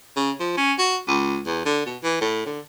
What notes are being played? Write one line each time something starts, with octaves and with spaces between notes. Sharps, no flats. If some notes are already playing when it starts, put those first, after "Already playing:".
C#3
F3
C#4
F#4
C#2
E2
D3
B2
E3
A2
D3